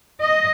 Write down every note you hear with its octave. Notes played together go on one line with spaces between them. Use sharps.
D#5